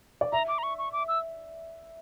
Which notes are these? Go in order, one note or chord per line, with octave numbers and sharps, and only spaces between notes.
D5
E5 A#5
D6
A#5
C#6
C#6
D6
E6